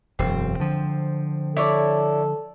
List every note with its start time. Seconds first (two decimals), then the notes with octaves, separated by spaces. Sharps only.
0.19 E1 F#2 C4
0.60 D3 F3
1.57 E4 A4 C#5 D5